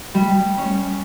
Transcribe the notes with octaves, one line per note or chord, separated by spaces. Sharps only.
G3
C#4